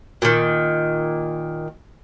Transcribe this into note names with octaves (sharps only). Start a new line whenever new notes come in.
A#2 D#3